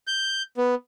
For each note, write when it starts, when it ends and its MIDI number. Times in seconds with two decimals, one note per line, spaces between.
0.07 0.42 91
0.58 0.75 59